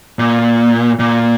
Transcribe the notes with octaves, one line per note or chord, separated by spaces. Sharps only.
A#2
A#2